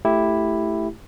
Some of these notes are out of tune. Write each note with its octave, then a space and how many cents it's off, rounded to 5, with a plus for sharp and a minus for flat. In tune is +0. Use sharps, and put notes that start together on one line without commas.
A3 +0 E4 +0 G4 +0